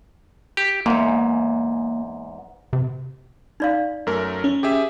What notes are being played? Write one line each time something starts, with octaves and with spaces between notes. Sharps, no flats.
G4
E2 G#2 A#3
C3
D#4 D5 F5
F#2 A3 A#4
C#4
G4 G#4 E5